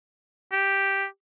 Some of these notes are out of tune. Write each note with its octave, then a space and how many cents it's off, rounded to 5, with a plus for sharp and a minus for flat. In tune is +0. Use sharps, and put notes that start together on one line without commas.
G4 +0